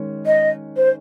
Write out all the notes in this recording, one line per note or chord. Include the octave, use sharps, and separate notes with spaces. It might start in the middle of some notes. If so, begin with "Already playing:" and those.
Already playing: D#3 G#3 C#4
D#5
C5